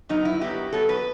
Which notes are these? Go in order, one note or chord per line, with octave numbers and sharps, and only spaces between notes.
F#2 F#3 B3 D#4
E4
F#2 F#3 B3 G4
F#2 F#3 B3 A4
B4